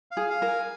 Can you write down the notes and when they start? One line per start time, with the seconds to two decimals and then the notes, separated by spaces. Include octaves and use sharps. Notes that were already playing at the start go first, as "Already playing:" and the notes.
0.11 F5
0.17 G#4
0.30 F5
0.42 A#4
0.48 G#5